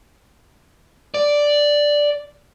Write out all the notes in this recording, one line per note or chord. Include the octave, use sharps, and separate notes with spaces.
D5